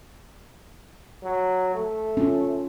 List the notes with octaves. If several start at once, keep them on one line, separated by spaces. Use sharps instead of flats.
F#3
A3
C#4 F4